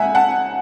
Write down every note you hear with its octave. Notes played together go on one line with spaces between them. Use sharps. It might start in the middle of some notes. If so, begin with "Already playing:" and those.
Already playing: C#2 C#3 G#3 E5 F#5 G#5
F#5 A5